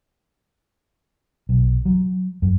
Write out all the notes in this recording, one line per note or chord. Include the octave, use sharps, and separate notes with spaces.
B1
F#3
F#2